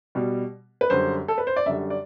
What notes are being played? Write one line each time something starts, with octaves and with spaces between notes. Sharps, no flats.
B2 G3
B4
F#2 D3 G3 C5
A4
B4
C5
D5
F#2 D3 G3 E5
D5